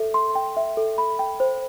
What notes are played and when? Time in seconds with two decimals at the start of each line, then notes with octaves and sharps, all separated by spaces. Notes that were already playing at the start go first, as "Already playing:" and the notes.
Already playing: A4 E5
0.14 C6
0.35 G5
0.57 E5
0.77 A4
0.98 B5
1.19 G5
1.40 C5